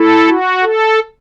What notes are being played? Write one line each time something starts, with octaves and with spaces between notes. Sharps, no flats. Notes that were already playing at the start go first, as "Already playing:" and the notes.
Already playing: E4 A4
F#4
A4